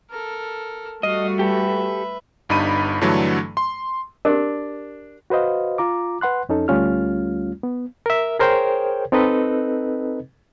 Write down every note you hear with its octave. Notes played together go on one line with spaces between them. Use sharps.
A4 A#4
G3 A3 F#4 D#5 F5 D#6
G4 A4 B4 E5
G1 G2 D#4 B5 D#7
G2 D3 E3 F#3 A3
C6
D4 G4 A#4
F#4 B4 C5 D#5 F5
F4 A#5 D6
B4 F#5 C6 F#6
F2 C#4 D#4 A4
D2 G3 A3 C#4 F4 F6
B3
A#4 E5
G#4 A#4 C5 C#5 G5
C4 D#4 A4 B4 D#5